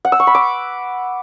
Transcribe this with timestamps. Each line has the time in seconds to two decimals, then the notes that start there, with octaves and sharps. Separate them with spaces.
0.05 F#5
0.12 E6
0.20 C#6
0.27 B5
0.35 D6